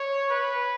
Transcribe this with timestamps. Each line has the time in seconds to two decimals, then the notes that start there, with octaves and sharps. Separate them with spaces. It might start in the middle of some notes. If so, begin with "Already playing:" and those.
Already playing: C#5
0.30 B4